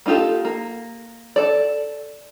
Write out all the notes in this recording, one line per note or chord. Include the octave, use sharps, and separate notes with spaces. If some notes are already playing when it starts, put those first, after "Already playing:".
A#3 D#4 F4 G4 A4
A#3
A4 D5